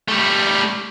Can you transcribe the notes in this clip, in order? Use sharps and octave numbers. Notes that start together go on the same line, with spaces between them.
G3 A3